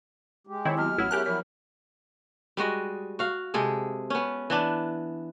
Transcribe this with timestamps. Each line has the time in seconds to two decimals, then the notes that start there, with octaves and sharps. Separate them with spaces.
0.47 G#3 G4
0.65 D#3 C4 E4 C#5 C#6
0.78 F#3 B3 F#4 F6
0.98 A1 D2 E4 F#4 C#5 F#5
1.11 G#3 B3 C#4 E4 G4 A#4 G#5 F#6
1.26 F3 F#3 E4 A#4 C#5
2.57 G3 G#3 F#4 D#5
3.19 F#4 F5
3.54 C3 G#3 G#4 A4
4.10 B3 C#4
4.50 E3 B3 D4